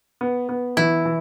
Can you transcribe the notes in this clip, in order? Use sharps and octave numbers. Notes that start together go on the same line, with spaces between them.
B3
B3
E3 E4
E3